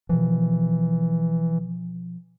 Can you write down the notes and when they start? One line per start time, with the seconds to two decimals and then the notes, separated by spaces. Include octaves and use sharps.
0.09 B2 E3 F3